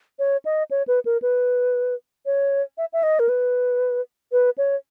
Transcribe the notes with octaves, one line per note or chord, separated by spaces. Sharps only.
C#5
D#5
C#5
B4
A#4
B4
C#5
E5
E5
D#5
A#4
B4
B4
C#5